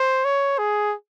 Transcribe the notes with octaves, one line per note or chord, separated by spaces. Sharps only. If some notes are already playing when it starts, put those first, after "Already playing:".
Already playing: C5
C#5
G#4